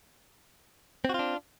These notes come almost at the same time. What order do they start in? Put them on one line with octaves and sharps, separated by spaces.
C4 F#4 F4 D4